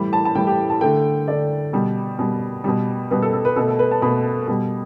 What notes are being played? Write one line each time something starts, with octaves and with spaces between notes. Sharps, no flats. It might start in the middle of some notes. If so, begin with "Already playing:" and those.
Already playing: A2 E3 G3 B5
A5
A5
A2 E3 G3 G5
G4
A5
D3 A3 G5
D3 A3 D5
B2 G3
B2 G3
B2 G3
B2 G3 B4
A4
A4
B4
B2 A3 A4
A4
B4
A5
B2 A3 B5
B2 G3